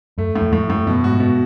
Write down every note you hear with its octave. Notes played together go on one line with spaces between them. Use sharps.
F#2 A3
A2
F2
F2 A2
F#2 A2
F#2 B2
G#2 F#4
B2